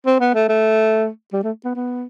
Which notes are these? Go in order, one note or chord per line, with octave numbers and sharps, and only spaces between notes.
C4
B3
A3
A3
G3
A3
B3
B3